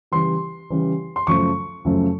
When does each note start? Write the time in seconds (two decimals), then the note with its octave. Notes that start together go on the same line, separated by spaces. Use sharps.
0.12 C#3 E3 G3 C6
0.70 C#3 E3 G3
1.16 C6
1.27 F#2 C#3 F3 A3 C#6
1.85 F#2 C#3 F3 A3